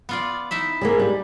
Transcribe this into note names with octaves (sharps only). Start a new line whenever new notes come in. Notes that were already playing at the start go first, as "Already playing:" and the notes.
B3 F4 D5
D#4 E4 E5
G3 G#3 A#3
G3